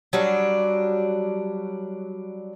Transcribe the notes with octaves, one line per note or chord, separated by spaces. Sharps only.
F#3 G3 D4